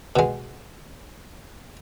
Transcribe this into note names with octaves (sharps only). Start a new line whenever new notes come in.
B2 G#3